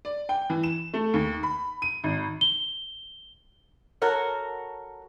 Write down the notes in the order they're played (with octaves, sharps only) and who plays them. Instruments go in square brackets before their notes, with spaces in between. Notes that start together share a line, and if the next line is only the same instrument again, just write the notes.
[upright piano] D5
G5
E3
E7
A3
D#2
B5
D#7
G#1
[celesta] G7
[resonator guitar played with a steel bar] F#4 A4 A#4 C#5 F#5